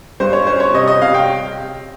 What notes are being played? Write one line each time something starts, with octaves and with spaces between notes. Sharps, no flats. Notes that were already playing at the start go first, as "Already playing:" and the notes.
G2 C5
C#5
C#4 C5
C#5
C3 D#5
D#5
C3 F5
G5